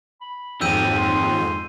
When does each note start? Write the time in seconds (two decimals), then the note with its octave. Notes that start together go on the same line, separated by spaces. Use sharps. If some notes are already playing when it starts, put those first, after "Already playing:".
0.21 B5
0.61 F2 G#2 D#3 F#4 G4 E6 G6 D#7
0.98 C6